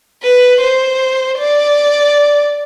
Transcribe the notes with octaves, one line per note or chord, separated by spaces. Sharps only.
B4
C5
D5